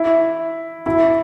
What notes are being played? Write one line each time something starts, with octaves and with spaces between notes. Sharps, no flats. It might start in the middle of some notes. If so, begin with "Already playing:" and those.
Already playing: E4
E4